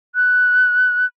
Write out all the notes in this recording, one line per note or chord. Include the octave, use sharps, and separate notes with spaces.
F#6